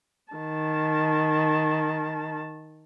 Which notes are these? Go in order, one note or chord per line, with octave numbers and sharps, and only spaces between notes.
D#3 A5